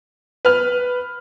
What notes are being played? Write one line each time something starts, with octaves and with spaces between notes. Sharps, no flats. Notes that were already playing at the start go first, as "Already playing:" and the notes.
B4 F6